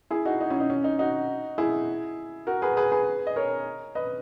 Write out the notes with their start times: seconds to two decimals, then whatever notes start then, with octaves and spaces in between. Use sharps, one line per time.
0.10 E4 G#4
0.25 D#4 F#4
0.41 D#4
0.50 C#4 E4
0.60 D#4
0.70 C#4
0.84 D#4
0.99 D#4 F#4
1.58 E4 G#4
2.47 F#4 A#4
2.62 G#4 B4
2.77 G#4 B4
2.92 G#4 B4
3.27 D#5
3.36 A#4 C#5
3.95 B4 D#5